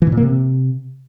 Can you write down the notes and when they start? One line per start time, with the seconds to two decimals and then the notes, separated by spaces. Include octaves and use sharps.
0.02 E3
0.07 G#2
0.12 A#2
0.17 A#3
0.23 C3